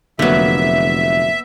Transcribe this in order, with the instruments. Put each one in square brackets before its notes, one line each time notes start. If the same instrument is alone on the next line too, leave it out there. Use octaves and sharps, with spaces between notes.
[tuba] F1 [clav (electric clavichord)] D3 F#3 [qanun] A#3 B3 [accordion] E5